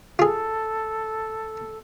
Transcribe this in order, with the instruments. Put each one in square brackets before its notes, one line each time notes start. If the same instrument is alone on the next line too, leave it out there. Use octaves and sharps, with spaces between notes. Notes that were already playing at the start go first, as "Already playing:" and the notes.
[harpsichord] F4 G#4 [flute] A4